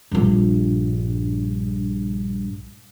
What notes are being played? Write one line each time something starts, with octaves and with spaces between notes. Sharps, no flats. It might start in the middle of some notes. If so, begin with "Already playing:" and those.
A#1 G2